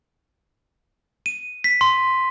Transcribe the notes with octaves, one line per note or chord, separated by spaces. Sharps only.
D#7
B6
C6